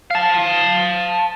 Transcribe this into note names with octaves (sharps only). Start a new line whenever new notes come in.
F5 A5